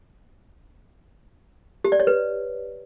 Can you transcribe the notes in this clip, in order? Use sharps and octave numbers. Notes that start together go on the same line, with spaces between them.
G4
D5
C#5
B4